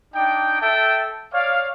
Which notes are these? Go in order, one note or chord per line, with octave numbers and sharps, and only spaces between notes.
D4 D#4 G5
A4 E5 G5 A5
C#5 D5 F5